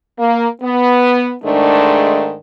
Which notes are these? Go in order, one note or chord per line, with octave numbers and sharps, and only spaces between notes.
A#3
B3
G#2 D#3 G#3 A3 D4